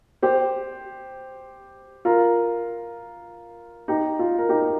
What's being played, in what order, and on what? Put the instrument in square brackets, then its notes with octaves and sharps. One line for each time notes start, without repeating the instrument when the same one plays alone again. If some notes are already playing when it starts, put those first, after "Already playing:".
[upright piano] G4 C5
F4 A#4
D#4 G4
F4
A#4
D#4 G4